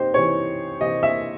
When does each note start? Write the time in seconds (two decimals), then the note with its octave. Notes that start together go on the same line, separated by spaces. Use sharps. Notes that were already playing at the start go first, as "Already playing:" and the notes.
Already playing: C3 D#4 G4 C5
0.14 C3 E3 C#5
0.81 C3 E3 D#5
1.03 E5